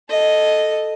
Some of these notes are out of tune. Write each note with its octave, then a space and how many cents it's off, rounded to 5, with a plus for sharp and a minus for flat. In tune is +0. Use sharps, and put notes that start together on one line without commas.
A4 +0 D#5 -5